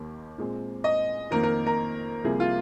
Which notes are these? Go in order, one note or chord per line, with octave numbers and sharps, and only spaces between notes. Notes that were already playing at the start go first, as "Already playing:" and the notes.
Already playing: D#2 D#3 A#3
A#2 G#3 C4
D#5
F2 D#3 A#3 A#4
A#4
A#4
C2 C3 F3 A#3 G#4
F4